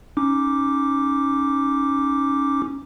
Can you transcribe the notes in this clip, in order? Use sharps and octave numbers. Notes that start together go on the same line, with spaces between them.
C#4 D#4 D6